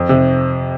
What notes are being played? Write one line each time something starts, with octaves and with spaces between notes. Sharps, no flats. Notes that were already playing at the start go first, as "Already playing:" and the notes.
Already playing: F2
C3